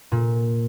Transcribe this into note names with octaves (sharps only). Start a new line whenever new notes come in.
A#2